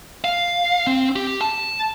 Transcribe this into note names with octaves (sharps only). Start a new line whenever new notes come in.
F5
C4
G4
A5